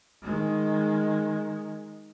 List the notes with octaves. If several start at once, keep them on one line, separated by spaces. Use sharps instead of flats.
D#3 G#3